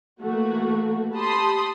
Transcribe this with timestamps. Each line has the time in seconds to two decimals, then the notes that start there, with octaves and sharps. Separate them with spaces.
0.21 E3 A3 A#3 F#4
1.14 G4 A5 B5 C6 D#6